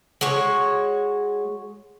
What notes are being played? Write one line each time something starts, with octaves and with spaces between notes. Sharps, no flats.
G#3 F#4 C#5